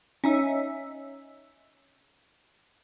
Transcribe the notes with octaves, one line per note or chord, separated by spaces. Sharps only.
C#4 D#4 E5